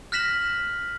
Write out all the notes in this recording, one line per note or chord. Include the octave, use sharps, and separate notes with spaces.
F6 F#6 A#6 B6 E7 F#7